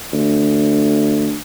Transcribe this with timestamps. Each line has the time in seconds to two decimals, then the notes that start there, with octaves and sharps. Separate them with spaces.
0.13 D2